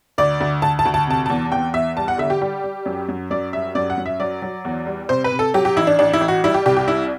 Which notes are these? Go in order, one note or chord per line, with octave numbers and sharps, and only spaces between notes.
D2 D5
D2
D2 A5
A5
D2
A5
C3 A5
E2 A5
E2 G5
E2 E5
G3 A5
F#5
D3 E5
G4
G3 G4
G3
F#2
F#2
F#2 D5
G3 E5
F#2 D5
F#5
F#2
E5
F#3 D5
F#3
E2
G3
C3 C5
B4
C3
A4
F#3 G4
G4
A1 E4
D4
A1 D4
E4
A1
F#4
G3 E4
G4
C2 G4
G4
G3 E4